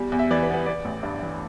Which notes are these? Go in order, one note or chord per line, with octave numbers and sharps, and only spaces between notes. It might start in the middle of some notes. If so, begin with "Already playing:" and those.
Already playing: E2 G3
E2
E5
E3 D5
B4
B3
B4
B3 D5
A1
G2
E3